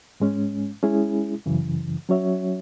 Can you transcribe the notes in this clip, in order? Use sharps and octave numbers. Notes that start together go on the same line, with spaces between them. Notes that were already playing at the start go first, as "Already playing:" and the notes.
G#2 G#3 C#4
G#3 C#4 E4 G#4
F#2 C#3 E3
F#3 C#4 F#4 C#5 E5